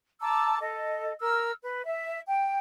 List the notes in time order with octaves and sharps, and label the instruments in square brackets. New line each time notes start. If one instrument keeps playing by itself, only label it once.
[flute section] A5 A#5 D6 E6
A4 D#5
A#4 E6 F6
B4
E5
G5